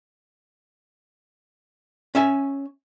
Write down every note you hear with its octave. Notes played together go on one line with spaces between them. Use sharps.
C#4 E5 G#5